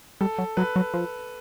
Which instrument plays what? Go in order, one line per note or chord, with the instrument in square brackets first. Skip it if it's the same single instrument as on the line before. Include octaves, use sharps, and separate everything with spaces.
[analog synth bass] G3 [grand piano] A4
[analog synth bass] F#3
[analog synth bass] F#3 [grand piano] B4
[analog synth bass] F#3
F3